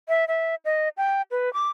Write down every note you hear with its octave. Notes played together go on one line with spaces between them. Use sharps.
E5
E5
D#5
G5
B4
D6